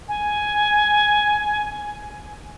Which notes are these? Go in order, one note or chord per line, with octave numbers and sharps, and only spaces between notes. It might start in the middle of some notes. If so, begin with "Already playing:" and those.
G#5